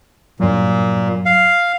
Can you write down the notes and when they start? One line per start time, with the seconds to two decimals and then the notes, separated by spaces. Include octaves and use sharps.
0.40 G2 A#2 F#3
1.26 F5